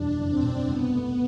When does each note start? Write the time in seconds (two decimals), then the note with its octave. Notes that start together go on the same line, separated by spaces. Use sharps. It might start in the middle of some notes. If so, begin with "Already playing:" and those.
Already playing: F#1 E2 B2 G3 D4
0.18 F#1
0.30 C4
0.42 B2
0.68 C2 B3
0.93 A3